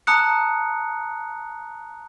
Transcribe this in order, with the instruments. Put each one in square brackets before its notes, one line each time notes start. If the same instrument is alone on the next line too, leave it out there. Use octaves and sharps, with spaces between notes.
[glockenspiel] A5 A#5 D#6 F#6 C#7